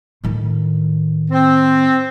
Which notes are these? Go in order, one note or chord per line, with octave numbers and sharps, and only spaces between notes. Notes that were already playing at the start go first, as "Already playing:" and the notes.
A2 D#3
C4